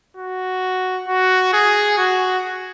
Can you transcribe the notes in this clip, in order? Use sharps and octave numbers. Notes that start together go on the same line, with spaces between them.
F#4
F#4
G#4
F#4